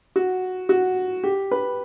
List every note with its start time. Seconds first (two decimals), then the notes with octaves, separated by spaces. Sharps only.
0.16 F#4
0.69 F#4
1.24 G4
1.51 B4